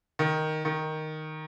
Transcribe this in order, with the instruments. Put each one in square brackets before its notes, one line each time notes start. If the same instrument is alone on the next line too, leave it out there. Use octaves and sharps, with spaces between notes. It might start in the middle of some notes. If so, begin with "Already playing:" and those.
[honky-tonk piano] D#3
D#3